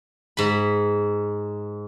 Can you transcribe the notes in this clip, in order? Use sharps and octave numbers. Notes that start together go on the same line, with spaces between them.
G#2 B5